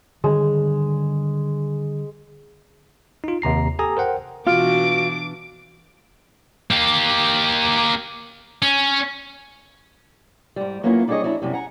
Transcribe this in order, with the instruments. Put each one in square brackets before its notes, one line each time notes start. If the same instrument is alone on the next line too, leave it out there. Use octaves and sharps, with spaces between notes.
[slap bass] D3 D#3 G3 [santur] G#3
[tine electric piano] D#4 F4
D#2 C3 A#5 C7
G4 A4 G#5 A#5 D#6
A#4 C5 F#5 G5
[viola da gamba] B2 E3 D4 [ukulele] F4 [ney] F#4 [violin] D6 D7
[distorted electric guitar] A#3 G4
C#4
[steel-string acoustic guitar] G#2 G3
F#3 A#3 B3 C#4 E4 F4
G3 D4 E4 G#4 C#5 D#5
F#3 C#4 D4 E4
F#2 C3 G3
F#5 G#5 A#5